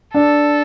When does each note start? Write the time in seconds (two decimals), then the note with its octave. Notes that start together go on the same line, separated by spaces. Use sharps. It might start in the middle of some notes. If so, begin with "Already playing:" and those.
0.14 D4 A4